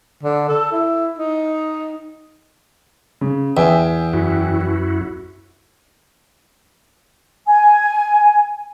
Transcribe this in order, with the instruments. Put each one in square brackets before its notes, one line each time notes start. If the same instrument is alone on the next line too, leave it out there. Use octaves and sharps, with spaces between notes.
[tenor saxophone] D3
A4
E4
D#4
[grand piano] C#3
[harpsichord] E2 [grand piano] E5 G5 G#5
[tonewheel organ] F#2 E4 F#4
[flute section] G#5